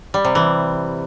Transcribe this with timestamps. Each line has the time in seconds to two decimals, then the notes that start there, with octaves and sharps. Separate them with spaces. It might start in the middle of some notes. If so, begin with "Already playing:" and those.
0.14 G3
0.25 C3
0.35 E3